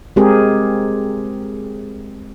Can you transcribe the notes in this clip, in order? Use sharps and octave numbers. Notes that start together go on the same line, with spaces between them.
G#3 C4 G4 G#4 A#4